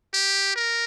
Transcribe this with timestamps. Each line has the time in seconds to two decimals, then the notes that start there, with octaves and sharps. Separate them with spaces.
0.14 G4
0.56 A#4